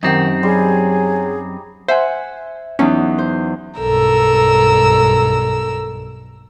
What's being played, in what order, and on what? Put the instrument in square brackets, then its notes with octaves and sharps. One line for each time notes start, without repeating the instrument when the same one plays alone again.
[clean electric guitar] F#2 C4 [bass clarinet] D#3 [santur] D#4 G4 F#5
[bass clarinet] F#3 [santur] G3 C6 [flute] G#4
[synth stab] C5 [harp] E5 F#5 G#5
[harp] E2 F#3 D#4 [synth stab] C#4
[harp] C5
[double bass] B1 G2 [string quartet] A4 A#4 E6